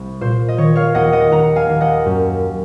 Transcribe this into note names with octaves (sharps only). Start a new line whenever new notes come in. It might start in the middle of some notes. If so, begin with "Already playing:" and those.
Already playing: C2
A#2 C5
D#5
D#3 C#5
C#5 F5
D#2 D#5 F#5
D#5 F#5
D#2 F#5 A#5
F5 G#5
D#2
D#5 F#5
F#2